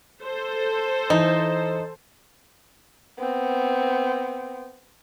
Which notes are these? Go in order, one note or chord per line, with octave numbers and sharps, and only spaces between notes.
A4 C5
E3 D#4
B3 C4